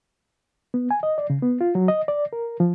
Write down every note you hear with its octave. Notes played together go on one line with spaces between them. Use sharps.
B3
G#5
D#5
D5
C#3
B3
F4
F#3
D#5
D5
A#4
F3